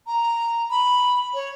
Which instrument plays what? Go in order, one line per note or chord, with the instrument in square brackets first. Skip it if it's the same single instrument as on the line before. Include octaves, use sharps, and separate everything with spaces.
[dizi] A#5
B5
C#5